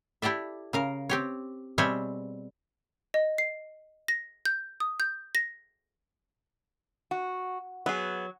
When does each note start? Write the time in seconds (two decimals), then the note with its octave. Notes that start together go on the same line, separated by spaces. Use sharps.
0.22 E4 G4 A4 D5 E5
0.73 C#3 A#4 F5
1.09 C4 G4 C#5
1.78 B2 G3 C4 G#4 C#5 E5
3.14 D#5
3.38 C7
4.08 A#6
4.46 G6
4.80 D#6
5.00 G6
5.35 A#6
7.11 F#4
7.86 F#3 B3 G#4